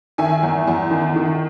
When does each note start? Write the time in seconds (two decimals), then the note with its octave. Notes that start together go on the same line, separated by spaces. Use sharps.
0.18 D#3 E5 G#5
0.43 E2
0.68 E2
0.91 D#3
1.16 D#3